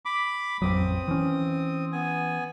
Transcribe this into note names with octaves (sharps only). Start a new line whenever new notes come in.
B5 D6
A1 F2 F#3 C4 D#6
E3 C#4
B3 G#5